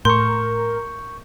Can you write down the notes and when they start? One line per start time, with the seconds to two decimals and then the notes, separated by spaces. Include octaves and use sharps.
0.05 A2 A#4 C6 C#6 G6